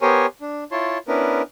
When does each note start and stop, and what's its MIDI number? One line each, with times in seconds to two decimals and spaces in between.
0.01 0.26 59
0.01 0.26 67
0.01 0.26 70
0.01 0.26 72
0.01 0.26 73
0.01 0.26 80
0.41 0.64 62
0.71 0.98 64
0.71 0.98 65
0.71 0.98 73
0.71 0.98 81
0.71 0.98 84
1.08 1.42 59
1.08 1.42 61
1.08 1.42 62
1.08 1.42 64
1.08 1.42 70
1.08 1.42 71